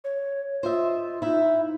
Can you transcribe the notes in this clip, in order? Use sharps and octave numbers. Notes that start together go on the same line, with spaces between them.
C#5
F4 C5 D#5 E5
D#4 E4 E5